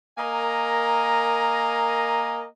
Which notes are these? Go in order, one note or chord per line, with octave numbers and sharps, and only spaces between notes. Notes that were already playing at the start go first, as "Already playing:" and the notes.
A#3 A#4 D#5 G#5 A#5